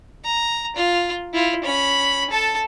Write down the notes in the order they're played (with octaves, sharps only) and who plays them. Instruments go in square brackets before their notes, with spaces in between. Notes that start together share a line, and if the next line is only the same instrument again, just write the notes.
[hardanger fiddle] A#5
F4
E4 F4
C#4 B5
A4 A5